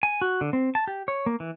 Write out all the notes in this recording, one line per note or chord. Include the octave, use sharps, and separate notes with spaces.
G#5
F#4
D3
C4
A5
G4
C#5
A#3
E3